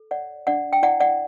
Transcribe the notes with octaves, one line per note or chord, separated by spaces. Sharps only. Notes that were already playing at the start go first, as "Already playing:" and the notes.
Already playing: A4
C#5 D5 F#5
D4 D5 F#5
G5
E4 D5 F#5
D5 F#5